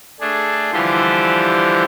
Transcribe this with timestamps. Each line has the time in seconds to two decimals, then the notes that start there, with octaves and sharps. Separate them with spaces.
0.20 A3 D4 G#4
0.73 D3 E3 F3 G3 G4 C5